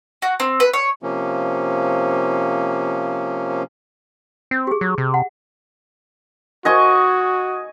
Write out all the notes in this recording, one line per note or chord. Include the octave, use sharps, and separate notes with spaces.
F#4
C4
B4
C#5
C3 F3 A#3 C#4
C4
G4 G#4
F#3
C3
F#5
F#4 D#5 G#5 C#6